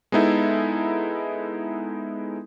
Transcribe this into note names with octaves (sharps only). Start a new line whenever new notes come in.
G#3 B3 D#4 E4 A4